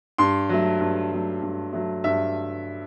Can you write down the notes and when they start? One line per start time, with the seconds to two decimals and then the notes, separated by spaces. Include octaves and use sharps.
0.18 G2 C6
0.49 F#3 A3
0.80 G2
1.11 F#3 A3
1.42 G2
1.73 F#3 A3
2.04 G2 E5